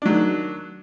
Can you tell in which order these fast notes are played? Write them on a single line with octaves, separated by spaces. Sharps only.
D4 F#3 D#3